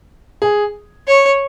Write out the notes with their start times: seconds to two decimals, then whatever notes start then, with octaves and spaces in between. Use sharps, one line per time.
0.42 G#4
1.07 C#5